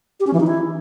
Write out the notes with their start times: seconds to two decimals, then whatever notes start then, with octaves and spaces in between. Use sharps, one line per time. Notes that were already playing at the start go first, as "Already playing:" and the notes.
0.20 G4
0.27 C#4
0.33 E3
0.40 D#4
0.47 E4